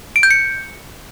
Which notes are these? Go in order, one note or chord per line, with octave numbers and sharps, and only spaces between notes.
D7
G6
C#7